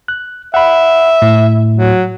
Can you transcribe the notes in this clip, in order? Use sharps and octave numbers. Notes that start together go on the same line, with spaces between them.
F#6
E5 F#5 B5
A2
F#3